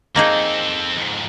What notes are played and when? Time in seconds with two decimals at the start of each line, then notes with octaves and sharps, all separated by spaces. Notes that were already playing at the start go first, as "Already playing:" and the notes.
0.16 A#3 C4 D#4 G#4 A4
0.97 F2 G#2